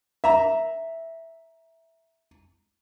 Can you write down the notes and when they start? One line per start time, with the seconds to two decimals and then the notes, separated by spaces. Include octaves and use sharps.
0.24 E5 A#5